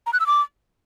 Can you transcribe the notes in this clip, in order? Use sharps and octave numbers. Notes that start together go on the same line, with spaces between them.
A#5
F#6
E6
D6